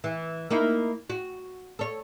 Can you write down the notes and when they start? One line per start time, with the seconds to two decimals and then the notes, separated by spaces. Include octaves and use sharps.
0.04 E3
0.50 A#3 D#4 E4
1.10 F#4
1.79 A4 C#5